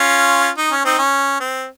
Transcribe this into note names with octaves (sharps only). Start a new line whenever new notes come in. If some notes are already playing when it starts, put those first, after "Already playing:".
Already playing: C#4 F4
D#4
C#4
C4 D#4
C#4
C4